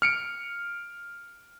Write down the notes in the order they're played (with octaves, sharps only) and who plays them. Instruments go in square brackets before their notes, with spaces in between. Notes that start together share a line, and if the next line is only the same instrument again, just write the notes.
[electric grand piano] F6 C#7 D7